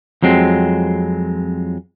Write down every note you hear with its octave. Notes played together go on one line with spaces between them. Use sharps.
F2 F#3 G#3 C4